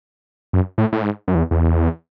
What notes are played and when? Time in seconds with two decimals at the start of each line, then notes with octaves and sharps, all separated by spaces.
0.53 F#2
0.78 A2
0.92 A2
1.02 G#2
1.28 F#2
1.35 E2
1.51 E2